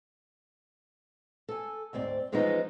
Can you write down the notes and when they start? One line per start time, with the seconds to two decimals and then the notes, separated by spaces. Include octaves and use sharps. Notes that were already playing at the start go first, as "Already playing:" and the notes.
1.49 A4 G#5
1.93 D2 G#2 C4 D5
2.32 E3 F3 G#3 B3 C#4 D#4